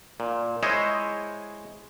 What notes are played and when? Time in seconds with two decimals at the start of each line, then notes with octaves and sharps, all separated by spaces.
0.20 A#2
0.63 G#3 E4 C5 C#5 D#5